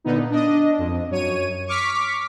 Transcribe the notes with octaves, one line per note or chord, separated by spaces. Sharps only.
A#2 D3 B3 D#4
D4 D#5
F2
F#2 C#5 D#7
C#6 D6 F6 B6